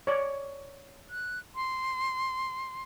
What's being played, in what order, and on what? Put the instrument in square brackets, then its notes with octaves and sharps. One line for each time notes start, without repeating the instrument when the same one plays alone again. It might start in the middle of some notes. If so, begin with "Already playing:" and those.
[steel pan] C#5 D5
[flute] F#6
C6